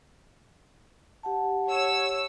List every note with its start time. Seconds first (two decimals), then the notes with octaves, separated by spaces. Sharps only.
1.23 G4 F#5 A5
1.68 C#5 E6